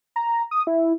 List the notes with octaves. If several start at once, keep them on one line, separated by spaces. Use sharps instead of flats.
A#5
D#6
E4